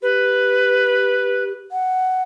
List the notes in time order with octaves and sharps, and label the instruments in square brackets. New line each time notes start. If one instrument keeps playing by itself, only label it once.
[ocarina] G4 [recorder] B4
[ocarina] F#5